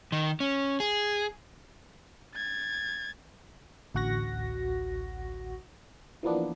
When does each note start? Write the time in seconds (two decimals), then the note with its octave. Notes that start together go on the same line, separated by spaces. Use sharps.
0.12 D#3
0.40 C#4
0.80 G#4
2.34 G#6 A6
3.95 A1 D2 F#4 F#5 C#6 A#6
6.23 E3 F3 A#3 B3 D4